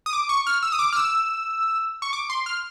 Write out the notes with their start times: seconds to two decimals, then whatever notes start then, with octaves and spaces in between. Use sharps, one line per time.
0.06 D#6
0.13 D6
0.29 C#6
0.47 F6
0.63 E6
0.72 D#6
0.79 D6
0.93 F6
0.96 E6
2.02 C#6
2.13 D6
2.30 C6
2.46 F6